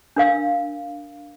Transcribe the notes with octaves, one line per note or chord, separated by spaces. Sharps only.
D4 A#4 F5 E6